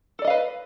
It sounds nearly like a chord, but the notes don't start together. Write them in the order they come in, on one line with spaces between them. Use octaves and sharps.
A4 D5 D#5 F5 B4